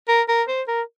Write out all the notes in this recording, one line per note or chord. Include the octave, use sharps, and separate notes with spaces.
A#4
A#4
C5
A#4